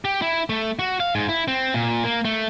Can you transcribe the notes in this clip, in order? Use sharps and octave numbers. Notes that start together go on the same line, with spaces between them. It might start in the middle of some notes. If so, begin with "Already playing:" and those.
G4
E4
A3
F#4
F5
G#2
E4
C4
A#2
A#3
A3